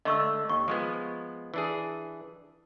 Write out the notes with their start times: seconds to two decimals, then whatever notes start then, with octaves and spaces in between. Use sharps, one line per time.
0.05 D3 A3 D#5 C#6 E6
0.49 D#2 C#6
0.68 F3 G#3 B3
1.54 E3 D4 G#4